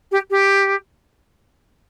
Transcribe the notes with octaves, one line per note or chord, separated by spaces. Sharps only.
G4
G4